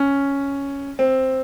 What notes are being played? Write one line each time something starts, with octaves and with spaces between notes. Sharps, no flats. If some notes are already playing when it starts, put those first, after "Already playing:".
Already playing: C#4
C4